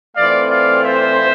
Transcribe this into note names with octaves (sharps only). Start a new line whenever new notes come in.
E3 A3 C4 F4 D5 F5
D5 F5
C5 E5